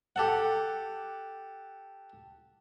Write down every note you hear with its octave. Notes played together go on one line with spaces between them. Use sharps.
G4 A4 F#5